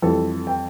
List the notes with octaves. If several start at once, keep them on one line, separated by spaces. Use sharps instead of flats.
F2 E3 G3 A4
G5